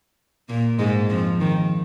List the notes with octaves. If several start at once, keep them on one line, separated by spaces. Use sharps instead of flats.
A#2 A#3
G#2 G#3
F2 F3
D#3